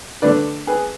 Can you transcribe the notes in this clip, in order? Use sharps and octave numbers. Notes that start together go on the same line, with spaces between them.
D3 A3 B4 D5
G#4 B4